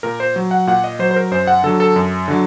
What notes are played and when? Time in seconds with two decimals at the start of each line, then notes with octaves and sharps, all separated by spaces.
0.03 A#2 A#4
0.20 C5
0.36 F#3
0.51 F#5
0.67 A#2 F#5
0.84 D#5
0.99 F#3 C5
1.11 C5
1.16 A#4
1.31 F#2 C5
1.47 F#5
1.63 D3 F#3 A4
1.80 A4
1.96 F#2
2.28 D3 F#3